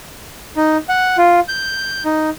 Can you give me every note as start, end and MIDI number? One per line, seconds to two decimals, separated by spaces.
0.56 0.77 63
0.89 1.17 78
1.18 1.40 65
1.48 2.03 91
2.05 2.30 63